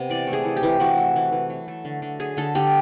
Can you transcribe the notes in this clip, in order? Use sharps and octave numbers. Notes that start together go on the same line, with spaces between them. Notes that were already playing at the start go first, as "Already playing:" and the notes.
Already playing: C3 B3
E3 D5
A3
G#4
E3
G4
E3
E3 F#4
A3
E3
E3
F#3
A3
D3
D3
F#3 G#4
D3 A4
D3 G4